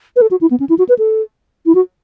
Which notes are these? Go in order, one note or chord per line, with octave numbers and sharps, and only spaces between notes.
B4
A4
F#4
E4
B3
C#4
E4
F#4
B4
A4
E4
F#4